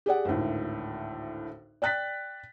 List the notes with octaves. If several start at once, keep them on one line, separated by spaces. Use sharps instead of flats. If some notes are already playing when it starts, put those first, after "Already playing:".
G4 G#4 D5 F#5
G#1 D2 A2
D5 G5 F#6 A6 B6